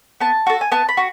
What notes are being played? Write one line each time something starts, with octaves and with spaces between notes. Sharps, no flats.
B3 A5
F#4 A4
G#5
B3 A5
B5
F#4